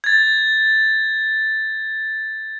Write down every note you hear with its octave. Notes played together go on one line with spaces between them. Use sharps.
G#6 A6